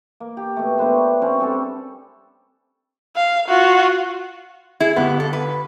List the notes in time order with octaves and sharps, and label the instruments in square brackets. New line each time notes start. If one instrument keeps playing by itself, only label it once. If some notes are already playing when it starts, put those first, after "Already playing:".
[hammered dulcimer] A#3
G4
B2 A3
A3 D4 B4 C5
C4 C#4 F#4
G3 C4 A4
[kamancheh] F5
F4 F#4
[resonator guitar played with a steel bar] E4 G#4
[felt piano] G1 G4 [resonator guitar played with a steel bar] B3
[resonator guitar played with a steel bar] A4
B4